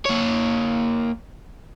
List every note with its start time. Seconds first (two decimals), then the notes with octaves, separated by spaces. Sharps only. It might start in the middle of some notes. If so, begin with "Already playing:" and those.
0.06 A#3 C#5